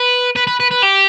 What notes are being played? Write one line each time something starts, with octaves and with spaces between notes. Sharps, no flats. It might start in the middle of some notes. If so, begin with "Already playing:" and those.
Already playing: B4
B4
B4
B4
B4
G4